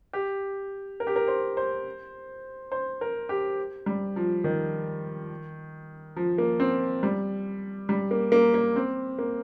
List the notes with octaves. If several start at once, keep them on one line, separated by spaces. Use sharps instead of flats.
G4
A#4
G4
A#4
C5
C5
C5
A#4
G4
G3
F3
D#3
F3
A#3
C4
G3
G3
A#3
A#3
A#3
C4
A#3